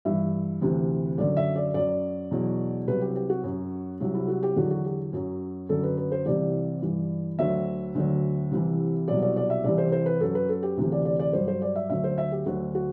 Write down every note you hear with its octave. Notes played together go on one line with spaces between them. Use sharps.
G2 E3 E5
D2 C3 E3
F#2 D3 F#3 D5
E5
D5
F#2 F#3 D5
E2 B2 F#3
C2 C3 F#3 B4
G4
G4
F#4
F#2 F#3
C2 C3 F#3
E4
F#4
G4
E2 D3 F#3 F#4
F#4
G4
F#2 F#3
F#2 D3 F#3 A4
B4
B4
C5
C2 C3 E3 D5
G2 E3
D2 D3 F#3 E5
D2 D3 F#3
C2 C3 E3
C2 B2 F#3 D5
D5
D5
E5
C2 C3 E3 D5
C5
C5
B4
F#2 F#3 A4
B4
A4
G4
D2 C3 E3
D5
D5
D5
G2 F#3 C5
C5
D5
E5
D2 D3 F#3 E5
C5
E5
G4
D2 D3 F#3 F#4
F#4